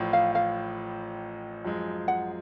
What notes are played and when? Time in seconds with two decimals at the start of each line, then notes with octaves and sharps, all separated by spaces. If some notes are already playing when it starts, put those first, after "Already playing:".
Already playing: A1 A2 F3
0.13 F5
0.35 F5
1.65 F#2 F3 G#3
2.08 F#5